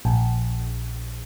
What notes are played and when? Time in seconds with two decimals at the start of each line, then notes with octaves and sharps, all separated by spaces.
0.05 A#1